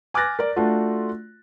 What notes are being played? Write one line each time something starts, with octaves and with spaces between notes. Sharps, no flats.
G#5 D6 F6 F#6 A6 A#6
A#4 D5
A3 D4 F4 F#4